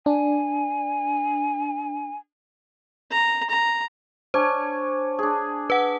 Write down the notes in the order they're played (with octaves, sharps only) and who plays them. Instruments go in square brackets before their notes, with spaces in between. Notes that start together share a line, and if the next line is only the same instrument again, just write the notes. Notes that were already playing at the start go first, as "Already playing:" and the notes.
[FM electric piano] D4 [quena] G#5
[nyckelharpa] A#5
A#5
[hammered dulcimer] D4 C#5 G#5 [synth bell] C5
[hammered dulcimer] D4 G#4
[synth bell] B4 F#5